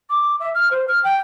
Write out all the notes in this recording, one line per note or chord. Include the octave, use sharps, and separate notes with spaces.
D6
E5
F6
C5
F6
G5